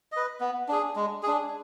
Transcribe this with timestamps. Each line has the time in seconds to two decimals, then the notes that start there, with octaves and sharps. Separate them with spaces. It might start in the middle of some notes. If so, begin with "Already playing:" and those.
0.12 B4 D#5
0.41 B3
0.68 D4 G#4
0.96 G#3
1.23 D4 G#4